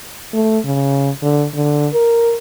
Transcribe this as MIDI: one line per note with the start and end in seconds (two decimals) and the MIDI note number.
0.33 0.59 57
0.64 1.10 49
1.23 1.46 50
1.54 1.88 50
1.93 2.36 70